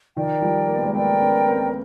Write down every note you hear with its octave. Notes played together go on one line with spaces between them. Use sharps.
D#3 F3 A#4 D5 G5
F3 G3
A#3
B3
G#3 A#3
A3 B3 A#4 D5 G5
B3 C#4
A#3 C4